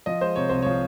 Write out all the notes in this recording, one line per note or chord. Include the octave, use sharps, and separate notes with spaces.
F3 D#5
G#3 C5
C3 C#5
C2 C5
F3 C#5